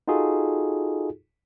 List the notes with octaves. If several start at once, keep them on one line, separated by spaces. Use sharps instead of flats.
D#4 F4 F#4 G#4 A4